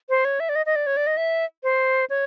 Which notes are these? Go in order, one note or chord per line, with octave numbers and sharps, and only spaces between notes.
C5
C#5
E5
D5
D#5
D#5
D5
C#5
D5
D#5
E5
C5
C#5